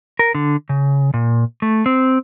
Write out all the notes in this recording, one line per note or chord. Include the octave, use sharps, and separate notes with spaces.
A#4
D3
C#3
A#2
A3
C4